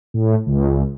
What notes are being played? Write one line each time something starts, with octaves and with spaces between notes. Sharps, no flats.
A2
C#2